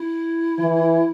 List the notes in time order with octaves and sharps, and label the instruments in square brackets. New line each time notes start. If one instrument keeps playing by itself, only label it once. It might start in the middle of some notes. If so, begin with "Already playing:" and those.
Already playing: [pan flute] E4
[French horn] E3